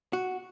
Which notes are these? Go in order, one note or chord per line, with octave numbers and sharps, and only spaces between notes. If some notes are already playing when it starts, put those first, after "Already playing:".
F#4